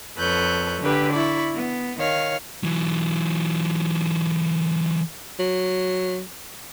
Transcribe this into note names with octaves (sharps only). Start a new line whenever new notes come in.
F2 A4 B4 C#5 F#6 G6
D3 G4 B4
E4 D5 B5 C#6
B3
D#3 C#5 F5
E3 F#3
F#3